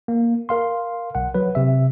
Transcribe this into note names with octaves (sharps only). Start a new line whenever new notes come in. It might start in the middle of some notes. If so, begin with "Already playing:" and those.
A#3
A#4 F5 C6
B1 F#5
F#3 B4
C3 E5